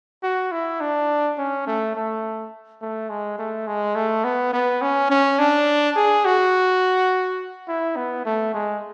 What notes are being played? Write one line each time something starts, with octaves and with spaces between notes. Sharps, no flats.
F#4
E4
D4
C#4
A3
A3
A3
G#3
A3
G#3
A3
B3
B3
C#4
C#4
D4
G#4
F#4
E4
B3
A3
G#3